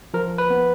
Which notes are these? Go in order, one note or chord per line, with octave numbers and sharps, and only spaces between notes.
F3 A#4
B4
B3